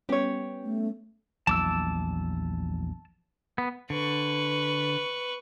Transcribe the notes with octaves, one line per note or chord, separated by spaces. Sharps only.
G3 B3 C#4 G4 C#5
A3
A#1 E2 F#3 A5 D6 E6
B3
D3 B4 C#6